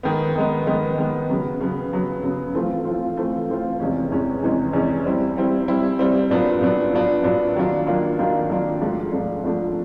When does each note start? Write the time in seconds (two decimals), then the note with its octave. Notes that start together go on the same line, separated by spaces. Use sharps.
0.03 D#3 G#3 B3
0.35 D#3 G#3 B3
0.67 D#3 G#3 B3
0.98 D#3 G#3 B3
1.30 C#3 F#3 B3
1.60 C#3 F#3 B3
1.92 C#3 F#3 B3
2.23 C#3 F#3 B3
2.54 E3 A3 C4 F4
2.85 E3 A3 C4 F4
3.17 E3 A3 C4 F4
3.49 E3 A3 C4 F4
3.80 E2 C3 E3 G#3 C#4
4.12 E2 C3 E3 G#3 C#4
4.42 E2 C3 E3 G#3 C#4
4.73 E2 C3 E3 G#3 C#4
5.05 G3 C4 E4
5.36 G3 C4 E4
5.68 G3 C4 E4
5.99 G3 C4 E4
6.31 A#2 F#3 B3 D4
6.61 A#2 F#3 B3 D4
6.93 A#2 F#3 B3 D4
7.24 A#2 F#3 B3 D4
7.56 D#3 F#3 A#3 D4 F4
7.87 D#3 F#3 A#3 D4 F4
8.18 D#3 F#3 A#3 D4 F4
8.49 D#3 F#3 A#3 D4 F4
8.81 G#2 F3 A3 D4
9.12 G#2 F3 A3 D4
9.44 G#2 F3 A3 D4